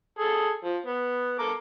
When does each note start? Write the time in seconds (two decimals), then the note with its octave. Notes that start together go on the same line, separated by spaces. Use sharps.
0.19 G#4 A4
0.64 F3
0.86 B3
1.39 A4 A#4 D6